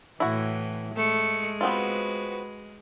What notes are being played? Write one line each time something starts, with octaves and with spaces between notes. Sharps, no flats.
A2 E3 E4 F#4
G#3 A3 C#7
B3 C4 F4 F#4 B4